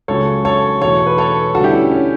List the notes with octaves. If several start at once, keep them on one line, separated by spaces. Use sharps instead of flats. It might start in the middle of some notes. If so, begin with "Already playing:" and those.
C#2 C#3 F#3 A4 C#5
A4 C#5
E2 B2 A3 A4 C#5
B4
A4 C#5
D2 D3 G3 F#4 A4
E4 G4
C#4
C#4